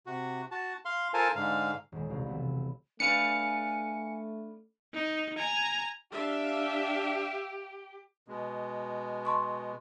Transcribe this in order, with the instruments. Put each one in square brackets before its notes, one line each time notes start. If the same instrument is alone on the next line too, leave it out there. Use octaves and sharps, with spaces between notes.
[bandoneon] C3 F#4
F#4 A5
F5 C6
F4 A4 A#4 C5 G#5 A5
G#2 D3 F5
[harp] D#1 G#3
E1 C2 F5
B1 A3 B3
[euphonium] A3 [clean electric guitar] D4 B4 F5 [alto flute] G#5 [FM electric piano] C#7
[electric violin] D#4
G#5 A#5
[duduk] D4 [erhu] G4 [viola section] E5 F5
[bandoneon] B2 G#3
[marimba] A5 C6 C#6